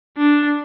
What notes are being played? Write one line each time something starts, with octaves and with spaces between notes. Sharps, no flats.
D4